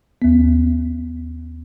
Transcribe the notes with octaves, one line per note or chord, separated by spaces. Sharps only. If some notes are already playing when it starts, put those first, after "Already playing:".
D#2 B3